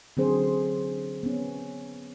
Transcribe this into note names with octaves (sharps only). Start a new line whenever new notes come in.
D3 F#3 C4 C#4 G#4 C5
B3 C#4